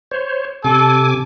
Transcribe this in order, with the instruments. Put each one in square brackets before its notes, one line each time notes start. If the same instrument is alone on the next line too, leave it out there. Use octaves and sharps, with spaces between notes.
[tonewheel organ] C5 C#5
[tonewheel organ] C3 G#5 D6 [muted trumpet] A4